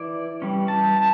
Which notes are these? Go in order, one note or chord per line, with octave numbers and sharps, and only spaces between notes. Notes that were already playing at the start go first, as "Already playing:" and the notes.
Already playing: E3 E4 D5
E3 G3 C#4
A5
A5